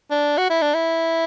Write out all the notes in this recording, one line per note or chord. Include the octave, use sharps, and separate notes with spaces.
D4
F#4
E4
D4
E4